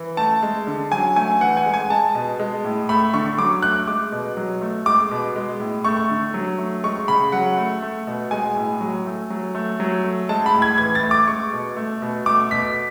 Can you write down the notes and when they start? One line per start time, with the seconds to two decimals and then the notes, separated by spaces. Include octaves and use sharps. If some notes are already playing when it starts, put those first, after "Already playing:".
Already playing: E3
0.17 A3 A5
0.43 G#3
0.67 D3
0.92 F#3 G#5
1.16 A3 G#5
1.41 E3 F#5
1.57 G#5
1.66 G#3
1.74 G#5
1.90 G#3 A5
2.15 B2
2.39 G#3
2.64 A2
2.89 A3 B5
3.14 D3 C#6
3.38 F#3 D6
3.63 A3 F#6
3.87 G#3 D6
4.12 B2
4.37 F#3
4.62 A3
4.86 G#3 D6
5.11 B2
5.36 G#3
5.60 A2
5.84 A3 C#6
6.10 D3
6.34 F#3
6.58 A3
6.84 G#3 C#6
7.08 C#3 B5
7.32 F#3 F#5
7.57 A3
7.82 A3
8.07 B2
8.31 G#3 G#5
8.56 A2
8.81 F#3
9.06 A3
9.30 F#3
9.55 A3
9.80 F#3
10.04 A3
10.29 G#3 A5
10.46 B5
10.54 A2
10.62 G#6
10.78 E3 G#6
10.95 A6
11.03 A3
11.11 D6
11.27 G#3 C#6
11.53 B2
11.76 A3
12.02 B2
12.26 A3 D6
12.51 B2 B6